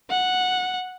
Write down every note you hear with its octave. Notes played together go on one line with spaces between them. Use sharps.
F#5